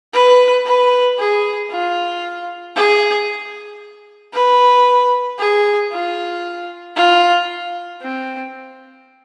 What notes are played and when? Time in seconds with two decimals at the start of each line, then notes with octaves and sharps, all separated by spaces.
0.13 B4
0.66 B4
1.19 G#4
1.71 F4
2.76 G#4
4.34 B4
5.39 G#4
5.92 F4
6.96 F4
8.02 C4